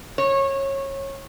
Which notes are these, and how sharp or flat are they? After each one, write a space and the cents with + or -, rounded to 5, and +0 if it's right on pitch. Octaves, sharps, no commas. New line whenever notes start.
C#5 -25